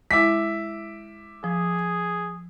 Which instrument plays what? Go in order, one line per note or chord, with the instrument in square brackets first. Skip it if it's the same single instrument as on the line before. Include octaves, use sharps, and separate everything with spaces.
[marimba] G#3 E4 [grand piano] E5 D6 B6
[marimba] F3 [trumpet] G#4